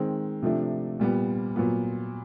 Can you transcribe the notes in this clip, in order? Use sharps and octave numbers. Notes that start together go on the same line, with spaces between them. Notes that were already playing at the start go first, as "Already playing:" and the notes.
Already playing: D#3 G#3 C4
C3 F3 A3 D4
A#2 G3 B3
A#2 F#3 B3